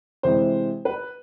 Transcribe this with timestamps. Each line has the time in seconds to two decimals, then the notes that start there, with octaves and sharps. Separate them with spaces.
0.23 C3 E3 G#3 C5
0.85 B4